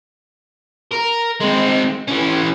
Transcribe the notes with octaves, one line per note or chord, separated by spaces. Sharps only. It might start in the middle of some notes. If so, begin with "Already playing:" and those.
A#4
G#3 C4
E3 C#4